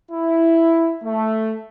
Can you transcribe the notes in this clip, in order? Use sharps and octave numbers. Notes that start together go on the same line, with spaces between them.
E4
A3